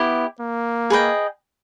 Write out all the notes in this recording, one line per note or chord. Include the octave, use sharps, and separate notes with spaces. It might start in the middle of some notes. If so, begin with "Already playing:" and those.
Already playing: B3 E4 G4
A#3
G#4 B4 D#5 G5